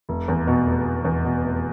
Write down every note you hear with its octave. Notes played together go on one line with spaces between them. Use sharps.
F1
E2
B2
F1
F1
E2
B2
F1